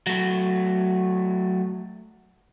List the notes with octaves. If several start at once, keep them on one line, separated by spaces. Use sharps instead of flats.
F#3 A3